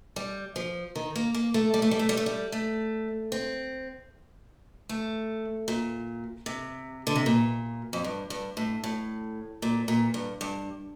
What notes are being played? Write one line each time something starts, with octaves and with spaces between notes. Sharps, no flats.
G3
F3
D#3
A#3
A#3
A3
G3
A3
G3
A3
G3
A3
G3
A3
C4
A3
A#2
C3
D3
C3
A#2
F2
G2
G2
A2
A2
A#2
A#2
G2
G2